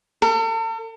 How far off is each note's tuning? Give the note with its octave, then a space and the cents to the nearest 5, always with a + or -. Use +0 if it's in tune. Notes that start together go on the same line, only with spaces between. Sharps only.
A4 +45